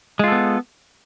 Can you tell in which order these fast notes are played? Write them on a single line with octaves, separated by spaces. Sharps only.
G#3 F4 A4 B3